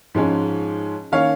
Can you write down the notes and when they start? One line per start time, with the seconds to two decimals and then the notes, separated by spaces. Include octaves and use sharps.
0.15 G#2 F3 G#3 C#4
1.12 D#3 A#3 C#4 C#5 F5